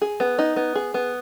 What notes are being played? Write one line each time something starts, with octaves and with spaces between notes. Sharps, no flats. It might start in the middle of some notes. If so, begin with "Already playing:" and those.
G#4
B3
D#4
B3
G#4
B3